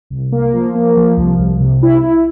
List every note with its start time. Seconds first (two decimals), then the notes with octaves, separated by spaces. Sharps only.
0.10 C2
0.32 A#3
0.53 F3
0.75 A#3
0.97 F3
1.17 C2
1.39 C2
1.60 C3
1.83 E4
2.03 E4